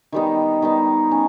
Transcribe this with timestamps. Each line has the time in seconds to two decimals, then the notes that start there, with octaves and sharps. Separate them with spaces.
0.12 D#3 G3 B3 D#4
0.62 D#3 G3 B3 D#4
1.11 C#4